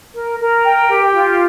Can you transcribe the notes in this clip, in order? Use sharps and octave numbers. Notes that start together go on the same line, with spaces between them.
A#4
A#4
G5
G4
F4